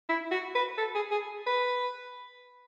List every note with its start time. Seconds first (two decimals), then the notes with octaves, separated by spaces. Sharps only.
0.09 E4
0.31 F#4
0.55 B4
0.78 A4
0.95 G#4
1.11 G#4
1.47 B4